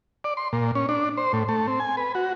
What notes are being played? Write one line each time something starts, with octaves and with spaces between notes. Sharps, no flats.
D5
C6
A#2
C#4
D4
C5
A2
A3
C4
G#5
B4
F#4